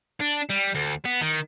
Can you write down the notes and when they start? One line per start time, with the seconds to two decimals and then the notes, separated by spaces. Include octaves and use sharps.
0.20 D4
0.50 G3
0.75 D2
1.05 B3
1.21 D#3